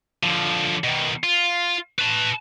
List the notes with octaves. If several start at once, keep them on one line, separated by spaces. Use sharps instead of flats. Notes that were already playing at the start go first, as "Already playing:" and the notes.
D3 F3
B2 D#3
F4
B4 A5